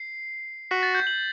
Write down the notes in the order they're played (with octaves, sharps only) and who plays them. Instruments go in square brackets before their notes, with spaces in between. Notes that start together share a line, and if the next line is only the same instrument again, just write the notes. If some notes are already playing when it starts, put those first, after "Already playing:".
Already playing: [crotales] C7
[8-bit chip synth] F#4 [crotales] B6
[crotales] A6
G6
F#7